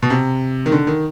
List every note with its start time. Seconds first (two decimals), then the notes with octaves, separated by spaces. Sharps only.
0.02 B2
0.10 C3
0.66 D#3
0.72 D3
0.87 D#3